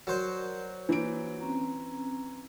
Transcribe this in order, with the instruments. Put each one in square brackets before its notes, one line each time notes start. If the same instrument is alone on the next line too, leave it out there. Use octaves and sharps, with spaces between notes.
[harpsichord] F#3 C5 [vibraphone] A#4 D5
[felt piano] E3 D7 [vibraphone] A#3
[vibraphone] C4 C#4 A#5